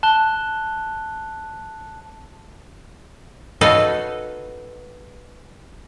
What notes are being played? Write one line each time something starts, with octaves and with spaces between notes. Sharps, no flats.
A5 F#6 G7
D#4 F#4 A4 B4 C#5 F5